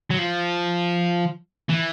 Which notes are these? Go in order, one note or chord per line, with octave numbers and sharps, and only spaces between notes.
F#3
F3
E3